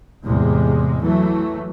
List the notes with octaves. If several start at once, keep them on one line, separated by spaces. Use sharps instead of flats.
E2 A2 C3 G#3
E3 F#3 A3